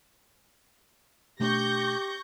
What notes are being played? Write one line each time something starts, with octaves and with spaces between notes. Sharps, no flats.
B2 A3 D4 G4 C#6 G6 A#6